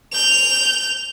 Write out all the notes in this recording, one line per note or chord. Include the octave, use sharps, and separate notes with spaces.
G6 F7